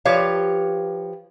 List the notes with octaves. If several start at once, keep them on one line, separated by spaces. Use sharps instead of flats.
F3 G4 B4 C#5 F5